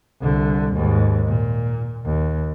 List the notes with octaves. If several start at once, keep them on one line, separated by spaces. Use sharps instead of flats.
C2 D3
D#2 G#2
A#2
D#2